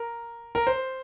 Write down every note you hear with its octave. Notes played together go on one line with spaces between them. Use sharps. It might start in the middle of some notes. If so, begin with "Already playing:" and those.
Already playing: A#4
A#4
C5